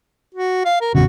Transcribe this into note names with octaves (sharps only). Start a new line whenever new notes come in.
F#4
F5
A#4
A1 E2 C#3 F#4